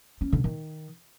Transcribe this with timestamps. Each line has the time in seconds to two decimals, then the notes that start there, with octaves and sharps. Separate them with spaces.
0.21 C#4
0.33 D3
0.44 D#3